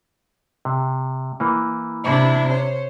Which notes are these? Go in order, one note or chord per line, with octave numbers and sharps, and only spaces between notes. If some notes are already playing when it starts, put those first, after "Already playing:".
C3
E3 A#3
C3 D4 E4
C5 C#5